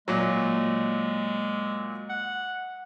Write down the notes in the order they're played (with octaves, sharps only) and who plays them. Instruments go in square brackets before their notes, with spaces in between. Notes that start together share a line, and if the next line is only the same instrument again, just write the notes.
[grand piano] A#2 F#3 [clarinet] G#3
[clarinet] F#5